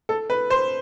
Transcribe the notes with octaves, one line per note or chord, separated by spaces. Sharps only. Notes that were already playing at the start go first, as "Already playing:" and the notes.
A4
B4
C5